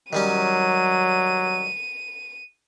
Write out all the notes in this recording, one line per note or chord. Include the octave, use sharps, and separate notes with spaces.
D#3 F#3 G3 C#4 D#7